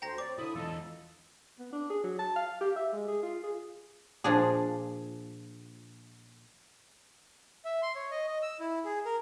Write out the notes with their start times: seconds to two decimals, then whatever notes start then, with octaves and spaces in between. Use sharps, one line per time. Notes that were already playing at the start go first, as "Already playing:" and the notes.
0.02 D2 F#4 C5 G5 A#5 A#6
0.18 C4 C#5 D5 D6
0.39 D3 E4 D#6
0.56 E2 F4 A4 D#5
1.59 B3
1.73 D4
1.90 G#4
2.04 F#3
2.19 A5
2.36 F5
2.61 G4
2.76 E5
2.93 G#3
3.08 G#4
3.23 F4
3.44 G#4
4.24 A#2 F3 D4 G#4
7.65 E5
7.82 C6
7.96 C#5
8.11 D#5
8.28 D#5
8.42 E6
8.60 E4
8.85 G#4
9.05 A#4